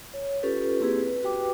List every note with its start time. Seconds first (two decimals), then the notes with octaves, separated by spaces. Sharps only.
0.14 C#5
0.43 C#4 F4 G4 A4 B4
0.80 A#3 C4 E4 G4 G#4 B4
0.98 B4
1.22 F#4 G4 B4 G5 D6